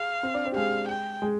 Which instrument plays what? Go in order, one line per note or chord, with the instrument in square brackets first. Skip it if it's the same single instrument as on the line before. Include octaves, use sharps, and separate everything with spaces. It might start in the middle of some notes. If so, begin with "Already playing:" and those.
Already playing: [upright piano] G#4 [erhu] F5
[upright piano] C4 C5
D4 D5
C4 C5
G4
[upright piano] G#3 G#4 [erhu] F5
[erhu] G5
[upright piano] G#3 G#4